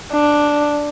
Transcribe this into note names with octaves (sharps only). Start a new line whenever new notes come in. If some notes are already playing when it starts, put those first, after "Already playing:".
D4